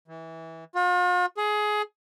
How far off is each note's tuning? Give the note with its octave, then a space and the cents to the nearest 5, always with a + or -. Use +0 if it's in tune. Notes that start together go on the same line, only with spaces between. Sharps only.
E3 -20
F4 +45
G#4 +20